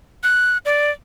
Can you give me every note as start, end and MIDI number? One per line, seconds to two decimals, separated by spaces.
0.23 0.58 90
0.65 0.90 74